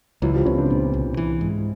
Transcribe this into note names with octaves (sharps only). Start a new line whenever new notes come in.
C#2 E3 F#3
F3 G3
C#2 B3 C#4
C4 D4
A#2
C2
E3
G#2